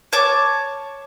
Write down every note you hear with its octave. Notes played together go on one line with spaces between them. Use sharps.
C#5 A5 D6